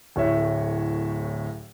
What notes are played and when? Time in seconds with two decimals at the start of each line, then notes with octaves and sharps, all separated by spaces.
0.16 D1 A2 C#5 E5